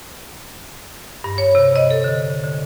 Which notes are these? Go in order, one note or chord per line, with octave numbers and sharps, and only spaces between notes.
G2
C#5
C3
D#5
A4
D3
D3